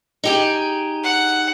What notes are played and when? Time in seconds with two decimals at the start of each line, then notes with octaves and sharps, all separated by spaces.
0.24 D#4 G4 G#4
1.04 F#5